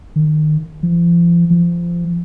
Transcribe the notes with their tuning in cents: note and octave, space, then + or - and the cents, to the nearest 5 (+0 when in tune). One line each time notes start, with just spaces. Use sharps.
D#3 -25
F3 -35
F3 -20